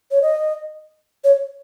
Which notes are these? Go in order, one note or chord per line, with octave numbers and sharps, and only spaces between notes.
C#5
D#5
C#5